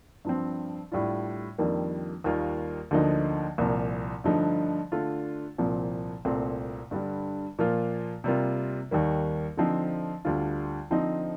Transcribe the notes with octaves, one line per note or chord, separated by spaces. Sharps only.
G2 F3 C4
A2 G3 D4 F4
F2 D#3 G3 A#3 D4
D#2 D#3 G3 A#3 F4
D2 D3 F3 A#3 D#4
C2 A#2 F3 A#3
G2 D3 F3 A3 D#4
D3 A3 D4 F4
C2 A#2 F3 C4
C2 A#2 A3 C4
G2 D3 G3
A#2 F3 A#3 F4
C3 G3 A#3 F4
D#2 D#3 G3 A#3
D3 F3 C4 D#4
D2 D3 G3 D4 F4
D3 F3 C4 D#4